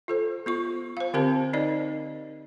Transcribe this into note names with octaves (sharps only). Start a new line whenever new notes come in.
F4 A4 C5
B3 F4 C#6
C5 F5
D3 C4 G4 A#4 C5 A5
D#4 A#4 D5 D#5